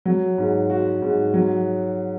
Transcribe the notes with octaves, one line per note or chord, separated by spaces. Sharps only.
F#3
G#2
F#4
G#2
F#3